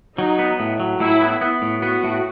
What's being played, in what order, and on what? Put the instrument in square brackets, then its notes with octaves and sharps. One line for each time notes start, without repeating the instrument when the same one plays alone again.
[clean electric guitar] F#3 [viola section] D#4
[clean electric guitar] B3
A2
F#3
[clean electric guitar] A2 [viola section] E4
[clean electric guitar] B3
B3
A2
[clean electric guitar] B3 [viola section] F#4
[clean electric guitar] A2